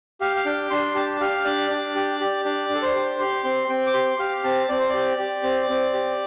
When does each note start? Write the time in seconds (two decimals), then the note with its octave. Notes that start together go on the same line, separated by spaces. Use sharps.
0.21 G4 F5
0.36 F5
0.45 D4 G5
0.71 D4 C6
0.95 G4 A5
1.21 G4 F5
1.45 D4 D5
1.70 D4
1.96 G4
2.20 G4
2.45 D4 D5
2.69 D4
2.75 A4
2.82 C5
2.95 G4
3.19 G4 C6
3.44 C4 C6
3.69 C4 G5
3.87 D6
3.94 G4 C6
4.19 G4 F5
4.44 C4 A5
4.69 C4 D5
4.79 C5
4.89 G4 D5
5.19 G4
5.43 C4
5.69 C4
5.94 G4